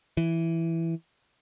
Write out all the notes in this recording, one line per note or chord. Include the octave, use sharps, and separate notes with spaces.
E3